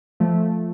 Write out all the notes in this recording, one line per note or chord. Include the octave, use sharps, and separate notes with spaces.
F3 A3